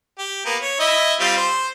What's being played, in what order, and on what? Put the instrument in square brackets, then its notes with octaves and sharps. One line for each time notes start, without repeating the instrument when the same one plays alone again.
[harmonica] G4
A#3 B3
C#5
E4 D#5 E5
G3 C4 F4
C5